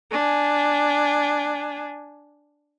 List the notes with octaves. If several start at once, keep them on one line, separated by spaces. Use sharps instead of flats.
D4 G#5